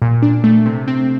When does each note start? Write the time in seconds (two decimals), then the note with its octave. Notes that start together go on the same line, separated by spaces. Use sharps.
0.02 A#2
0.22 D4
0.44 A3
0.66 C3
0.88 C4